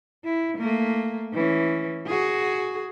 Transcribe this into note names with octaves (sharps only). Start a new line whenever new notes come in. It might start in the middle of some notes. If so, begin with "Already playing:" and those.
E4
A3 A#3
E3 C#4
F#4 G#4